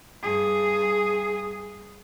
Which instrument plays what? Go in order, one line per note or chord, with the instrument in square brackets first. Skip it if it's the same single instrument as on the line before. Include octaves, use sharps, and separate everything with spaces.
[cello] G2 G#4